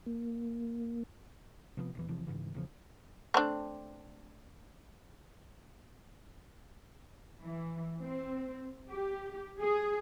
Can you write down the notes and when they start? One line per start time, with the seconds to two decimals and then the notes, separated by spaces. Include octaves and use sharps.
0.06 A#3
1.77 C3 F3 A#3 B3
1.95 A#1 E2 E3
2.08 E1 C3 E3 F3
2.27 G#1 G#2 C#3 E3
2.54 E2 C#3 F3
3.34 A3 C4 D4
7.41 E3
8.00 C4
8.88 G4
9.59 G#4